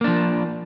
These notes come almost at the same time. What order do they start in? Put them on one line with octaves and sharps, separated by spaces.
A#3 D4 F3